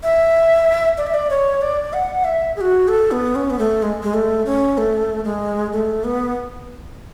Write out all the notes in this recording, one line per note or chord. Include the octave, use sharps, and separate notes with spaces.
E5
D5
E5
D5
C#5
D5
F#5
E5
G#4
F#4
A4
B3
C#4
B3
A3
G#3
G#3
A3
C#4
A3
G#3
A3
B3